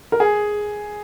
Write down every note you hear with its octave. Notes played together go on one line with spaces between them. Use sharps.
A#4
G#4